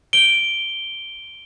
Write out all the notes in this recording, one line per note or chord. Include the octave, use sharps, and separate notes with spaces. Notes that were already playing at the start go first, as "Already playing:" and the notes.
D7 G7